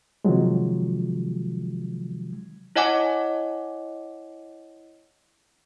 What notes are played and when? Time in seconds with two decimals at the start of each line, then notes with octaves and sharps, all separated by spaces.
0.25 C3 D#3 F3 F#3 G#3
2.76 E4 C#5 D#5 F#5 G#5 D6